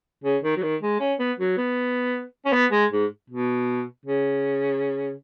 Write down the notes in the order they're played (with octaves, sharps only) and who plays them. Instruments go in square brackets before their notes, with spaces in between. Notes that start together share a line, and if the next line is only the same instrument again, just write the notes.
[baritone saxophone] C#3
D#3
F#3
D#3
G#3
C#4
B3
F#3
B3
C#4
B3
G#3
G#2
B2
C#3